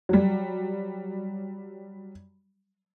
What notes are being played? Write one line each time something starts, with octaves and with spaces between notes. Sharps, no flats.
F#3 G3